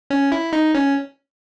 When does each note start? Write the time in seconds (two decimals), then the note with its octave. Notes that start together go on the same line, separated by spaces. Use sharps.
0.10 C#4
0.32 E4
0.53 D#4
0.75 C#4